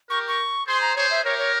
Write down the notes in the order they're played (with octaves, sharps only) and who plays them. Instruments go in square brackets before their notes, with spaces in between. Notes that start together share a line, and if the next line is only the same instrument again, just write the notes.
[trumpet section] G4 A#4 [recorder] C#6
[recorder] C#6
[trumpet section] G#4 C5 [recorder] C6
[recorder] A#5
[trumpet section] G#4 C5 [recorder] C#5
[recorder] E5
[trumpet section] G4 A#4 [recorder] C#5
[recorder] C#5